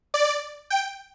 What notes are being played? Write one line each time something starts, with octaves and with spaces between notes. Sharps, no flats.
D5
G5